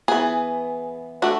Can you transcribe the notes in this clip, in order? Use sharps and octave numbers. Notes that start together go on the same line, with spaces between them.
E3 G#3 B3 G#4
A3 D4 F#4